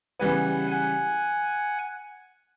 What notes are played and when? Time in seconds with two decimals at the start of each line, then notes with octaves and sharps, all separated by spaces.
0.19 C#3 E3 G3 B3 F#5 G#5
0.71 F#5 G#5